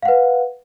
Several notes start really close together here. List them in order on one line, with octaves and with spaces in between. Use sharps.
F5 F#5 B4